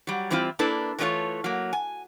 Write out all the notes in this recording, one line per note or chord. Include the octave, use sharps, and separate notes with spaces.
F#3 G3
E3 G3 C4 E4 F4
A#3 D4 E4 A4 B4
E3 G3 A3 D4 F4 C#5
F#3 A#3
G#5